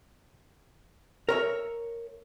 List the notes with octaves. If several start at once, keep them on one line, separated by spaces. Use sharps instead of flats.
A#4 C#5 E5